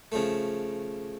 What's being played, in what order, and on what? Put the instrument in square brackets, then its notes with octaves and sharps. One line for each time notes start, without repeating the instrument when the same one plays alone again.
[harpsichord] C#3 F3 A3